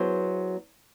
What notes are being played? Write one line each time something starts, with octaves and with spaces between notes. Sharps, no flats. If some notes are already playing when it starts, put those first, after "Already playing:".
Already playing: F#3 B3 E4 G#4 C5